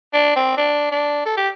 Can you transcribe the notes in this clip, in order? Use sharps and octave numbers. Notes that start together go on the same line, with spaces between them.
D4
C4
D4
D4
A4
G4